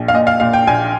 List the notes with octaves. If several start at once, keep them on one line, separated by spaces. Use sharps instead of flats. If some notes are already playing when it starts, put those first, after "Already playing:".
Already playing: A#1
F5
A#2 D#5
F5
A#2 F5
G5
A#1 G#5